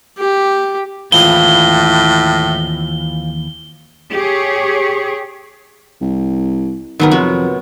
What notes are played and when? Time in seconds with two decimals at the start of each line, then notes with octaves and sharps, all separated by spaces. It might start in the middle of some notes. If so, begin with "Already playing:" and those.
0.18 G4
1.12 D#2 A2 E3 F3 G#3 C4 B4 G7
4.13 G4 G#4 C#5
6.01 C2
6.99 D#3 F#3 B3 A#4
7.11 F2 C3 B3 F#4